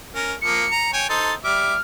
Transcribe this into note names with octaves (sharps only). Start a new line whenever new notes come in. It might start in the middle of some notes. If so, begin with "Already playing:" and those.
C#4 A#4
F3 A#3 C#7
A#5
C#5 G5 G#5
D#4 A4 C5 A6
G3 E5 D6 F6